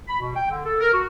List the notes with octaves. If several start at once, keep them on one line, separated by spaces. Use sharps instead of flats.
B5
B2
G5
D3
A4
A#4
F#4